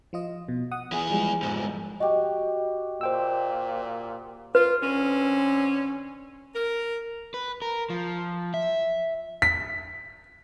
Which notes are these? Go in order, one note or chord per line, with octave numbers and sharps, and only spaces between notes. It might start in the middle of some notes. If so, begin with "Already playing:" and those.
F3 F4 D#5
B2
F#5 D#6
E3 G#4
F3 G3 G#3
F2 G#2
F#4 G4 D#5
A#2 C5 G5 E6
F4 B4
D3 C4 C#4
A#4
B4
A#4
F3
E5
B6